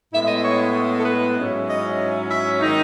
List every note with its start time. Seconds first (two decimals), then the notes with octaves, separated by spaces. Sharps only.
0.13 A2 G#3 B3 E4 E5
0.28 D#5
0.44 C#5
0.98 A4
1.05 B4
1.37 G#2 F#3 C#4 E4
1.67 D#5
2.31 E5
2.61 D#3 G#3 D#4